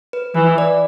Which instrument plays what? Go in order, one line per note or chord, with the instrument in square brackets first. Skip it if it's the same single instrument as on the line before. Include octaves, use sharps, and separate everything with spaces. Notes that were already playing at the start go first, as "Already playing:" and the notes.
[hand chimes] B4
[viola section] E3 [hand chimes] B4
[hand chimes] D5